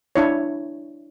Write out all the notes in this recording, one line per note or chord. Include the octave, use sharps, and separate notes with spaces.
D4 E4 C#5